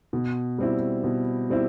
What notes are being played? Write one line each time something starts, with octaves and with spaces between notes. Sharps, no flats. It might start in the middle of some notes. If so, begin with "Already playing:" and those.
B2
G3 C4 E4
B2
G3 C4 E4